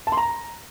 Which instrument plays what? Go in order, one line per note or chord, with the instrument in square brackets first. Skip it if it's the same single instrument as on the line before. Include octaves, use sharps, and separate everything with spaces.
[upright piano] A5
C6
A#5